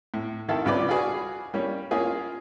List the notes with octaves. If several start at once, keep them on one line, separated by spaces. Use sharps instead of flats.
A2
C3 D#3 E4 A4 F5 A5
C2 C#3 F4 B4 D5 D6
F#4 G#4 B4 D5 F5 B5
G3 A#3 C#4
A#3 C#4 F4 G#4